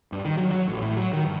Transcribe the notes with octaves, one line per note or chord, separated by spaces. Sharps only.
G2
D#3
F#3
F#3
A1
A2
F#3
D#3
G2